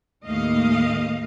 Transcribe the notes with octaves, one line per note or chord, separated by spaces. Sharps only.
D#2 A2 A3 A#3 D#5 F5